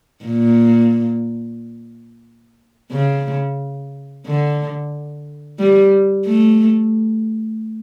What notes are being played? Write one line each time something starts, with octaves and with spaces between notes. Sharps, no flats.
A#2
C#3
D3
G3
A3